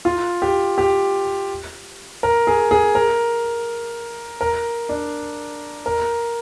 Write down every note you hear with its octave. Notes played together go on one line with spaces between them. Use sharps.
F4
G4
G4
A#4
G#4
G#4
A#4
A#4
D4
A#4